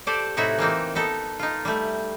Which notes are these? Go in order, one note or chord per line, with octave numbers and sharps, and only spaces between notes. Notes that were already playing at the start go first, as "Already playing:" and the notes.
G4 A4 C5 D5
A2 C3 D#4 E4 F#4 E5
E3 A#3 C4 D#4
B3 D#4 A4
D#4 F4
G3 A3